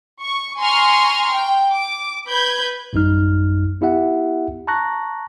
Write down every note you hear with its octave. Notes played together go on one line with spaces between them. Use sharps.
C#6
G#5 A#5 C6 C#6 F6
G5
D6
B4 B5 G6 G#6
A1 F#2 G3 D#4 F6
B3 E4 G4 E5 F#5
A5 A#5 C#6 F#6 A#6